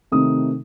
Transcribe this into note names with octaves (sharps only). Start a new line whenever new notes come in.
C3 D#3 A3 C4 D#4 D#6